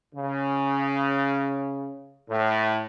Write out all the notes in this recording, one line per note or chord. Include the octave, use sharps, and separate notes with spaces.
C#3
A2